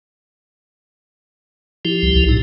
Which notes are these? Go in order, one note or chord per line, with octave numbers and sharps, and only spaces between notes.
F3 E4 G4
C2
B1
A2 D#4